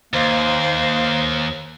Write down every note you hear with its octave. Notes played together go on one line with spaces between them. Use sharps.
D#2 A#3 C5